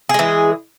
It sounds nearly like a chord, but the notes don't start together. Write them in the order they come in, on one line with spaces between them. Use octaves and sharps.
G#4 G#3 E3